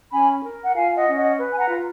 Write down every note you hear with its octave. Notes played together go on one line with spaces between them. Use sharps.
C#4 G#5 B5
A#4
F#5
F4 F5 G#5
D#5 F#5
C#4
D#5 F#5
B4
G#5
F#5 A#5
F4